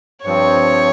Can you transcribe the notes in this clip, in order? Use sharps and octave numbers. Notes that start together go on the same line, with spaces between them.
G2 F3 C4 C#5